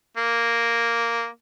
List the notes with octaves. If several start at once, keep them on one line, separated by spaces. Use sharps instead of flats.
A#3